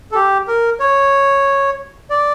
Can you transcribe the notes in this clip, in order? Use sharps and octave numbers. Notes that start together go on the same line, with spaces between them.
A4
G4
A#4
C#5
D5